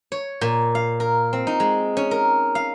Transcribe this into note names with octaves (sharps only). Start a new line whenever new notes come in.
C#5
A#2
F5
A#4
C4
D#4
G#3
C#4
A#4
F5